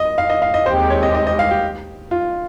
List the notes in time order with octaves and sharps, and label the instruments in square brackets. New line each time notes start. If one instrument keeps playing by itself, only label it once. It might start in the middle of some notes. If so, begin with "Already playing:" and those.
Already playing: [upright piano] D#5
F5
D#5
F5
D#5
[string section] D#2 D#3 G#3 C4 G4 [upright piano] C5
[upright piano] C#5
D#5
D#5
D#5
F5
G4
F4